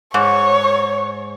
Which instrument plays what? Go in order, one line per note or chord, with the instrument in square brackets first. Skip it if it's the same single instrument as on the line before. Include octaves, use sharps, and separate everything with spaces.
[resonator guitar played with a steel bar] G#2 [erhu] C#5